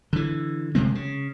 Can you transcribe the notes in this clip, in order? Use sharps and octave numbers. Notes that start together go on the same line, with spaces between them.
D3 E3
F#1 C3 G#3 C4
C#3